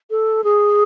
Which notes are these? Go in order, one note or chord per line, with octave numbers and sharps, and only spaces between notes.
A4
G#4